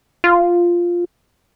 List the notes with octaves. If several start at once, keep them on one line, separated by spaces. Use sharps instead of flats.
F4